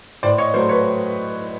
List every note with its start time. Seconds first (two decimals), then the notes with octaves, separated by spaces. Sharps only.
0.23 A2 C5 D5
0.38 C#5 D#5
0.54 F#3 A3 C5 D5
0.69 B4 C#5